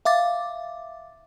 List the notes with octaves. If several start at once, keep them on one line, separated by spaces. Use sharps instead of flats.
E5 F5 D6 A6